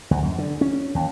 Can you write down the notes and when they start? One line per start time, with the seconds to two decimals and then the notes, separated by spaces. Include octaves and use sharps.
0.11 D2
0.23 F#2
0.38 D3
0.61 C#4
0.95 D#2